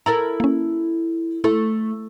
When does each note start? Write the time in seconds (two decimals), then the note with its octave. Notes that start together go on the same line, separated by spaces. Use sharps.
0.06 E4 A4 A#4 A#5
0.40 A#3 C#4
1.44 A3 E4 A4